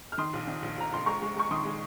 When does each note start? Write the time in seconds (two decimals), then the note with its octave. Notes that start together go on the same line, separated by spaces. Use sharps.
0.12 F6
0.18 D#3 C6 D#6
0.33 A#1
0.47 D#3
0.63 A#1
0.78 A#1 A#5
0.92 A#1 C6
1.06 G#3 A#5 C#6
1.22 G#3
1.36 G#3 C#6
1.51 D#3 C6 D#6
1.65 G#3